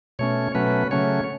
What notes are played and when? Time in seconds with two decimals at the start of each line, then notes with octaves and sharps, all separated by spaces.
0.19 B2 A3 C#4 C#5
0.54 B2 F#3 A3 C#4 B4
0.91 C#3 F#3 A3 C#4 C#5